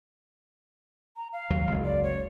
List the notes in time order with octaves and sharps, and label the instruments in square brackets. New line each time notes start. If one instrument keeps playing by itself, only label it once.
[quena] A#5
F5
[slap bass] D#2 F#3
F#1 C#2
[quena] D5
C#5